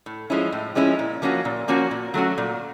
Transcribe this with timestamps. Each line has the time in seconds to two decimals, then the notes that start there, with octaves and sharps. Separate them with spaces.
0.06 A2
0.30 F3 G#3 C#4 E4
0.52 A2
0.75 F3 G#3 C#4 E4
0.99 A#2
1.22 F3 A#3 C#4 F#4
1.45 A#2
1.68 F3 A#3 C#4 F#4
1.91 A#2
2.14 F#3 A3 C#4 F#4
2.38 A#2